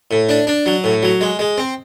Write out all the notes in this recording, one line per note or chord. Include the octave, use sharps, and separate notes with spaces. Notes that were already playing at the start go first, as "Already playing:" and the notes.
A2
D4
D4
F#3
A2
F#3
G#3
G#3
C4